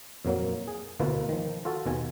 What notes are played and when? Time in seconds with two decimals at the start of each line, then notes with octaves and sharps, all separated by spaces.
0.25 F2 A#2 F#3 A#3
0.68 G#4
1.00 D2 B2 A#3 E4 F4 B4
1.29 D#3 F3
1.65 F4 F#4 A4 A5
1.86 D#2 B2 G#5